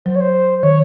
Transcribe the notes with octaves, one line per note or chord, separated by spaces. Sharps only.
F#3 C5
C#5
C5
C5
D#3 C#5